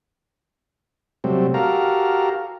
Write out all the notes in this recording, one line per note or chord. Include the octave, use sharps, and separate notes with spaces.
C3 F#3 G3 A3 C4
F#4 G4 A4 A#4 F5 A#5